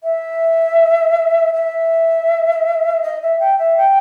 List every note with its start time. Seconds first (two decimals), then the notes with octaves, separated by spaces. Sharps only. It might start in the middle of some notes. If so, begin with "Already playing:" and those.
0.03 E5
1.53 E5
3.02 D#5
3.22 E5
3.39 G5
3.58 E5
3.77 G5